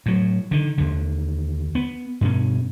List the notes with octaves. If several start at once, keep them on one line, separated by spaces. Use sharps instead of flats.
A2 F#3
D3 D#3
D#2 D3
B3
G2 B2 C#4